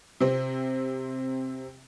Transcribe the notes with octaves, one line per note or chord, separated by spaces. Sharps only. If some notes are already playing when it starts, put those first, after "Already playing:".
C3 C4